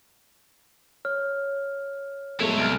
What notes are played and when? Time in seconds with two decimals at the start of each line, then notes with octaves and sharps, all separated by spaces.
1.05 C#5 F6
2.40 F#3 G#3 A3 B3 E4 C#5
2.58 C2 F6 D7